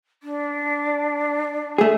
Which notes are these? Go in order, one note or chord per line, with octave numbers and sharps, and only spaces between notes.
D4
A3 G#4